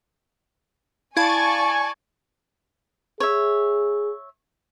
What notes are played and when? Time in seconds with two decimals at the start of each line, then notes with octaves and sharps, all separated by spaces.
1.17 E4 D5 F5 G#5 A5 B5 C#6 G#6
3.20 G#4 C#5 E5